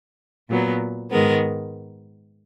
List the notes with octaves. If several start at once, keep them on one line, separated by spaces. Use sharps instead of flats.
A#2 F#3 B3
G#2 D#3 G#3 B3 A#4